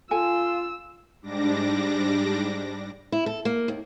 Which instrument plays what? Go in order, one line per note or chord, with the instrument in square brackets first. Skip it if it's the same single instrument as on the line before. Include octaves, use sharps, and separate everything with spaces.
[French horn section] F4 [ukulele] A4 G#5 [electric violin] E6
[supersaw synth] G#2 G3 D4 D6 A#6
[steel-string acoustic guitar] E4
A4
A#3
D#2